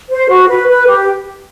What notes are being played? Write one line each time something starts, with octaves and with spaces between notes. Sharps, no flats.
C5
F#4
B4
B4
G4